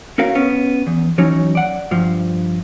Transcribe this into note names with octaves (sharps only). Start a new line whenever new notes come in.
C#4 F#4 A#4 F5
B3 C#4
E2
E3 F#3 C#4 D#4 C#5
D5 F#5
G2 F3